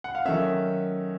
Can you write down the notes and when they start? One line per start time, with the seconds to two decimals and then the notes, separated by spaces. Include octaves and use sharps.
0.04 F#5
0.15 F5
0.25 D#3 F#3 A3 C#4 E5